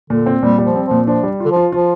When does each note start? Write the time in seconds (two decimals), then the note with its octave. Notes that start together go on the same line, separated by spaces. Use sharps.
0.10 A#2 D3
0.26 C4
0.42 A#2 G3
0.58 G3
0.65 F3
0.75 C4
0.85 F3
0.91 A#2
1.07 F3 D4
1.23 G3
1.40 D3 F4
1.51 F3
1.56 F4
1.72 F3 F4